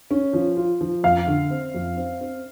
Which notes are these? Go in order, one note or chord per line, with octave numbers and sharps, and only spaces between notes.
C#4
F3
F4
F3
F2 F5
D3
C4
F2
C4
C4